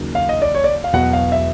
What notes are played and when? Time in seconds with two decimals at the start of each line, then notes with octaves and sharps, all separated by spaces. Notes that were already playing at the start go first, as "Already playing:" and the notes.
Already playing: D#2 C#3 F#3
0.15 F5
0.29 D#5
0.42 D5
0.55 C#5
0.64 D5
0.84 F5
0.93 E1 E2 B2 F#3 F#5
1.13 F5
1.32 E5